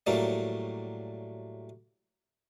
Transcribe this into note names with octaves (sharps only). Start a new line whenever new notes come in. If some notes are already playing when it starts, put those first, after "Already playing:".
A2 F#3 G3 A#3